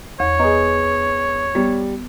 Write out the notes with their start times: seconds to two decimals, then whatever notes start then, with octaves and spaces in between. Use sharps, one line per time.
0.20 E2 C#5
0.39 B3 G#4 D#5 A#5 C#6
1.55 G3 B3